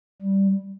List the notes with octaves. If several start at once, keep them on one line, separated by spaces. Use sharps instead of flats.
G3